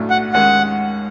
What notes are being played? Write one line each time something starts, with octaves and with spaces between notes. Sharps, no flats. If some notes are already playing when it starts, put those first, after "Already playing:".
Already playing: B1 A2 F#3 A3 D4
F#5
D#2 D#3 G#3 C#4 F#5